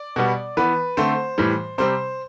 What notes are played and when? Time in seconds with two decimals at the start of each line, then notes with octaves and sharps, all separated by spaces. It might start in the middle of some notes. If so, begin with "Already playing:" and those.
Already playing: D5
0.16 B2 G3 B3
0.57 E3 B3 B4
0.97 D3 A3 C4 C5
1.38 A2 E3 G3
1.78 C3 G3 C4 C5